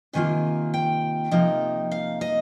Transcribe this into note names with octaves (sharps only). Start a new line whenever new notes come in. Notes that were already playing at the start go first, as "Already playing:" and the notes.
C3 D#3 A#3 F4 G#5
G5
C3 F3 A#3 D#4
F5
D#5